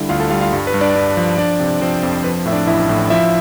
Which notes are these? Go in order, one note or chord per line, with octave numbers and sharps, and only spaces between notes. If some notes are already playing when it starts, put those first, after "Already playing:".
Already playing: D3 G3 E4 E5
D2 F4 F5
A4 A5
G3 F4 F5
F4 F5
G2
B4
G2
D4 D5
G2
F3
F3 D4 D5
C3
F3 C4 C5
F2
F3 B4
A2 E5
D4 D5
A1 E4 E5
A2
F3 E4 E5